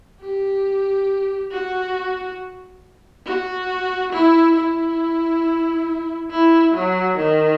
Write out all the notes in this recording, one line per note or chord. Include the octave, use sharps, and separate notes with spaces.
G4
F#4
F#4
E4
E4
E4
F#3
D#3